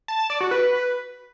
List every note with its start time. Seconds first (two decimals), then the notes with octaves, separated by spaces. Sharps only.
0.08 A5
0.19 A5
0.30 D5
0.41 F#4
0.51 B4